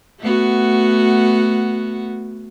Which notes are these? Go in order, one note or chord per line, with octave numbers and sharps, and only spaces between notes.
A3 B3 F#4